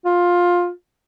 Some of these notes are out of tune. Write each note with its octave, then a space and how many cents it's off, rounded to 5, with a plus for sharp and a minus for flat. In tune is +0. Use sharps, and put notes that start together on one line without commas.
F4 +15